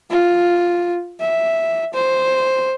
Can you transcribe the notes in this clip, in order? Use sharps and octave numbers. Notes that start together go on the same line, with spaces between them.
F4
E5
C5